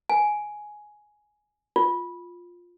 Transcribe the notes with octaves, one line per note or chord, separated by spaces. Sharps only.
G#5
F4